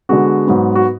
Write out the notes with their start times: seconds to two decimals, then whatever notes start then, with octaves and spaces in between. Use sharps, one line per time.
0.09 D3 G#3 B3 F#4
0.47 G#2 F#3 B3
0.75 F#4